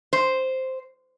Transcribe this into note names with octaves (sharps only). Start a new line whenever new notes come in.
C5